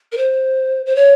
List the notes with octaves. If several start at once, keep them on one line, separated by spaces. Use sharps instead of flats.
A#4
C5
C5
C#5